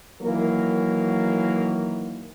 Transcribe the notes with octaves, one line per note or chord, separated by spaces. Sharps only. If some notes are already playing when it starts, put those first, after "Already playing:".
D#3 E3 F#3 A#3 A#4